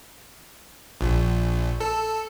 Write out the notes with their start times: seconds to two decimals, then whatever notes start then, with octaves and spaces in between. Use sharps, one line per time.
1.01 A#1
1.80 A4